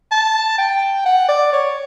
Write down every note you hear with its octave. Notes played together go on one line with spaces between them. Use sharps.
A5
G5
F#5
D5
C#5